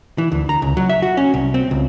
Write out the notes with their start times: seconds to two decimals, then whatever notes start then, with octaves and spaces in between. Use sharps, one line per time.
0.18 E3
0.32 D2
0.49 A#5
0.62 C#2
0.77 F#3
0.89 E5
1.02 F#4
1.17 C#4
1.34 C2
1.54 C4
1.71 C#2